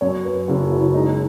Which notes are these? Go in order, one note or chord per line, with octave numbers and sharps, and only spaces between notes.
F#2 C#5
B4
F#1 F#4
E4
G#3 D#4